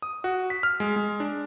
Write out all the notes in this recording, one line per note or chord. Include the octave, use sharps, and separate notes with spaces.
D#6
F#4
B6
F6
G#3
G#3
D4